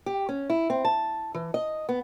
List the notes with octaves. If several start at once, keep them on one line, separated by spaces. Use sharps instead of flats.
G4
C#4
E4
C4
A5
E3
D#5
B3